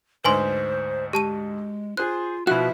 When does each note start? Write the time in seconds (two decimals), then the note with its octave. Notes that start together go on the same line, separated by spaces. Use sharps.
0.25 D2 G#2 B4 C5 G#5 C6
1.13 G#3 G4 A5 D#7
1.97 F4 G#4 C5 F#6
2.47 B2 F3 E4 F#4 E5 F#6